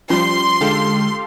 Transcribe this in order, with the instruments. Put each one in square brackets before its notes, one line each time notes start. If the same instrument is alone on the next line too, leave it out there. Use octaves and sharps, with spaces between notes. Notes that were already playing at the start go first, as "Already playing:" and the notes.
[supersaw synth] F3 G3 [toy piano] C#4 F4 [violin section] C6
[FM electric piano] D3 G#3 [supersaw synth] G4 A4 F5